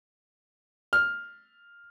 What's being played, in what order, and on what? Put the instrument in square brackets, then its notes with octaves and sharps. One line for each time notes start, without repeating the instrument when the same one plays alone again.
[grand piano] F6